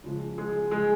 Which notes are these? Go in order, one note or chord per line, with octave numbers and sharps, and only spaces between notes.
C#3 F3 G#3
G#3 G#4
G#3 G#4